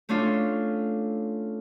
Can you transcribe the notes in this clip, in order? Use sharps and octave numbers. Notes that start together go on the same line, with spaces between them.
A3 C#4 D4 F4